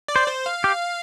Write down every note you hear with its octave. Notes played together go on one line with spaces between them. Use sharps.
D5
C5
C5
F5
G4